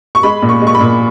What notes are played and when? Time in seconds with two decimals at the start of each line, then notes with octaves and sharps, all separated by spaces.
0.15 C#6
0.23 G#3 B5
0.42 A#2
0.49 C#6
0.62 G#3
0.67 C#6
0.75 B5
0.81 A#2